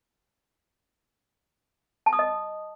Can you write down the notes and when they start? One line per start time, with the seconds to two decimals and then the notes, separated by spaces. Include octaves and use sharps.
2.06 A5
2.13 D#6
2.19 D#5